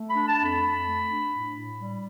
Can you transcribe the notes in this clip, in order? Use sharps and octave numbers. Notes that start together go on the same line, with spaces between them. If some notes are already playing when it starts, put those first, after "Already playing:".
Already playing: A3
B5
D4
A5
F2
B5
F2
A3
D4
A2
A2
G3